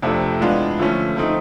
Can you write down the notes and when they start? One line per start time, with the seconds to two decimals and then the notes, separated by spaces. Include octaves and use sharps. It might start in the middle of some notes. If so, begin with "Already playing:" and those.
0.02 F2 C3 F3 A3 D4
0.40 E3 G#3 B3 D4 F4
0.79 D3 F3 A3 C#4
1.16 F3 A3 C4 D#4